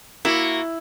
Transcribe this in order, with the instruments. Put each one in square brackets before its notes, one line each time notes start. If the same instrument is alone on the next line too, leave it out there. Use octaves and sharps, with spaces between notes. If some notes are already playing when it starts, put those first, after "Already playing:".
[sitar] A#3 F#4 [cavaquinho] E4